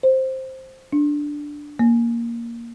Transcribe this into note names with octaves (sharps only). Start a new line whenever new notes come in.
C5
D4
A#3